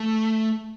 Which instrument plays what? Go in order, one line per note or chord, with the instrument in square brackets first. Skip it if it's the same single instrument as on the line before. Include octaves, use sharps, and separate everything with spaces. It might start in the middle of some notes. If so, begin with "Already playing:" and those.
Already playing: [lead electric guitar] A3